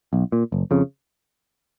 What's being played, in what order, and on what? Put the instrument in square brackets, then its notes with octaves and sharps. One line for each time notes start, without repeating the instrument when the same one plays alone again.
[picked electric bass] B1
A#2
F#1
F2 C#3